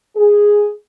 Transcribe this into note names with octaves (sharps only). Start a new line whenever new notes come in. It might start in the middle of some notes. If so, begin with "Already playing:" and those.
G#4